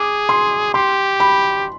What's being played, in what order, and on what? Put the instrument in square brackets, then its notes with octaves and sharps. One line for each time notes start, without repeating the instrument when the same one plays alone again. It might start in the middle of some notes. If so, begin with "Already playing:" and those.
Already playing: [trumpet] G#4 [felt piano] D6
[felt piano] C6
[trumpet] G4 [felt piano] C6
[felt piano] B5